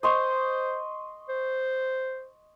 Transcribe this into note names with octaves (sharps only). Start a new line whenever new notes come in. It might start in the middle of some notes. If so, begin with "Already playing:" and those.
C5 D#5 C6 C#6
C5